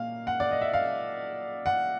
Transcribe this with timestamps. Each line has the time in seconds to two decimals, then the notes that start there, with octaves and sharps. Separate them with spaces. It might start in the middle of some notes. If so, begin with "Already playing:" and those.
Already playing: A#2 A#3 F5
0.27 F#5
0.40 D5
0.51 D#5
0.61 E5
0.73 F5
1.66 F#5